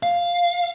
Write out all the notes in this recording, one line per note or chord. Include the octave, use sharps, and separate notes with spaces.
F5